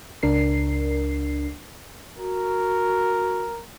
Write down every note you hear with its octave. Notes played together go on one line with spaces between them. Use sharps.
C#2 D4 A#4 C7
F#4 A#4